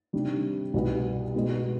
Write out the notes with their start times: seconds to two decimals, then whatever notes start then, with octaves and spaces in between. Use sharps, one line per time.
0.13 C3 D#3 G3 D4
0.74 C2 B2 G3 B3
1.34 B2 G#3 B3